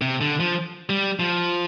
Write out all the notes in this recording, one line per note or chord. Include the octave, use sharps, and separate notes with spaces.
C3
D3
F3
G3
F3